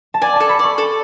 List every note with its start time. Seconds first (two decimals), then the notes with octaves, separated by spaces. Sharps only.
0.14 A5
0.22 D5 G#5
0.36 A4 A5
0.49 B5
0.59 D5
0.64 C#6
0.78 A4